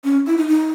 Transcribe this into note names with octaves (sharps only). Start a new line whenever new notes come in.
C#4
E4
D#4
D#4